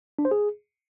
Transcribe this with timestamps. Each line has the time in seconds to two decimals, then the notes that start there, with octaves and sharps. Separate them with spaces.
0.19 D4
0.25 C5
0.31 G#4